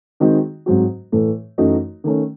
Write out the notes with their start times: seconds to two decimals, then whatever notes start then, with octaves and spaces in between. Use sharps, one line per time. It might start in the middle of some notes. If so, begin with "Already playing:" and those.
0.20 D#3 G#3 C4 D#4 F#4
0.66 G#2 F#3 C4 F#4
1.12 A2 E3 A3
1.58 F#2 E3 A3 D#4 F#4
2.04 D#3 A3 C#4